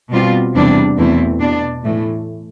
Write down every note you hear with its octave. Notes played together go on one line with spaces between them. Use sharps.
B2 G3 C4 F4
E2 C3 E3 G3 D4
E2 B2 A3 C4 E4
B2 B3 D4
A2 E3 A3